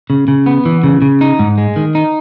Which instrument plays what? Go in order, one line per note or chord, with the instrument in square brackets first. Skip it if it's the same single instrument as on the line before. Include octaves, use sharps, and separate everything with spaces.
[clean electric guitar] C#3
C#3
B3
E3
C#3
C#3
D#4
G#2
G#3
D#3
D#4